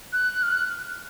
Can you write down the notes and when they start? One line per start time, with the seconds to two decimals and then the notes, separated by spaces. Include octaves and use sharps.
0.13 F#6
0.43 F6
0.52 F#6